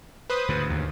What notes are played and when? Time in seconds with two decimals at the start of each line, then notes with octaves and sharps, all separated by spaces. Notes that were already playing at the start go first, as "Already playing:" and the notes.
0.30 B4 C5 D#6
0.49 D2 G#2 C#3
0.70 D#2